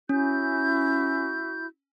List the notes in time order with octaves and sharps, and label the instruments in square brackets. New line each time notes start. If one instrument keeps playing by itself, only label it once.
[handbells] C#4 [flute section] E4 F#4 G6